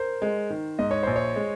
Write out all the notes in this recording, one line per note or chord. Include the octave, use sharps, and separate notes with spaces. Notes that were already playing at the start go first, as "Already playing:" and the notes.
Already playing: A#4 C5
G#3
D#3
G#2 D#5
C#5
A#1 C5
C#5
G#3